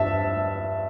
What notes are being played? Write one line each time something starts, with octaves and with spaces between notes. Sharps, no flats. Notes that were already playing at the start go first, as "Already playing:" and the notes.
Already playing: G2 E5 A5